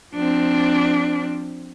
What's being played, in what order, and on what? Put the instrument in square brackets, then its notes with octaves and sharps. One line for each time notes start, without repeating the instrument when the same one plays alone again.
[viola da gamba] F3 C4 [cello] D4